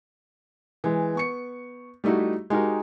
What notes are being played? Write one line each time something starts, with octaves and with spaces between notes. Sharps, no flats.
E3 G#3
B3 C#6 C#7
G3 A3 D#4 E4 F#4
G#3 D#4 F#4 G4 A#4